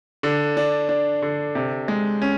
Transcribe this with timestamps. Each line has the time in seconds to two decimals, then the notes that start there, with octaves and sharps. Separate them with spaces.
0.23 D3
0.57 D4
0.89 D4
1.22 D3
1.55 C3
1.88 G#3
2.22 C#4